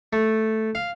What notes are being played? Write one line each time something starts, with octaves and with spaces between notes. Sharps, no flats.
A3
F5